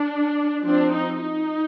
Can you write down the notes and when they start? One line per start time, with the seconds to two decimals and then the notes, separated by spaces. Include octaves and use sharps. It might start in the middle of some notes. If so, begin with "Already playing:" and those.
Already playing: D4
0.64 F3 C4 D4
0.93 D#4
1.21 D#4